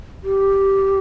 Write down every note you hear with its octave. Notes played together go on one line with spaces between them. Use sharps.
G4